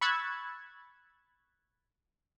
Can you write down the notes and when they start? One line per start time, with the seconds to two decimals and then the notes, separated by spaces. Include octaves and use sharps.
0.01 B5 C#6 E6 F#6 G#6 A6